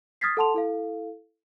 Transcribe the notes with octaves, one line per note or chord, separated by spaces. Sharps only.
D#6 F6 G#6 A6 B6 C7
A4 F#5 A5 C6 F7
E4 A4 F5